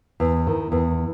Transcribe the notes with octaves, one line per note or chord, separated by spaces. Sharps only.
E2
D#3
E2